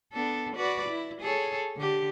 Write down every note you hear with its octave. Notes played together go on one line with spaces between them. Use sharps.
B3 D4 A4
F#4 B4 D5
E4
G#4 A4 C#5
D3 G4